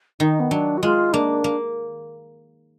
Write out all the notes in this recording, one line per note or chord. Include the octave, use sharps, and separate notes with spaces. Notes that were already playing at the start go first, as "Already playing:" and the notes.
D#3 D#4
B3
F#3 D4
F#4
G#3 F4
A#3 D4
A#3